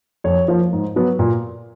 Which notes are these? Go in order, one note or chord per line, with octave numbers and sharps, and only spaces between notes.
F2 C#5
F3 A#3
G#2
F#3 B3
A#2